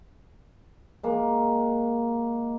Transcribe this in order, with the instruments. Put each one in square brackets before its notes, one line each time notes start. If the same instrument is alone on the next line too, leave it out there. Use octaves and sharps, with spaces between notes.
[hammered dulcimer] G#3 A#3